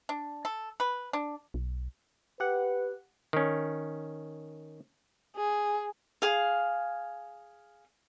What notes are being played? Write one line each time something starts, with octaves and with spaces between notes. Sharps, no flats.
D4
A4
B4
D4
B1
G4 B4 F#5
D#3 C#4
G#4
G#4 F5